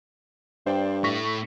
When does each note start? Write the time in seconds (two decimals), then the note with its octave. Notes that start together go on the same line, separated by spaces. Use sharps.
0.67 G2 C5 D5 G5
1.04 A2 A3 C#6 A#6 B6